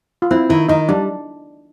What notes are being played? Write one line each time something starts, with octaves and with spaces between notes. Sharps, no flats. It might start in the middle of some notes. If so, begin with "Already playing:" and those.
F4
C4 E4
D#3 E4
D#3 D#4
G3 D4